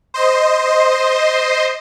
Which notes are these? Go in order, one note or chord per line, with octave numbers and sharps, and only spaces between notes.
C5 D#5 C6